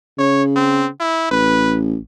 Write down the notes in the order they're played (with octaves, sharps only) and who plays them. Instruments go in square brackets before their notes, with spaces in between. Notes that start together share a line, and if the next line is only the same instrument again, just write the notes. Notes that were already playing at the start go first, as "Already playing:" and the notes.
[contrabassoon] C#3 [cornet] C#5
[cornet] C4
E4
[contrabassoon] A1 [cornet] B4